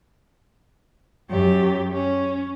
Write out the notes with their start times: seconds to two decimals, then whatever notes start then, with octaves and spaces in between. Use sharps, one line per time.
1.29 F#2 G4
1.93 C#4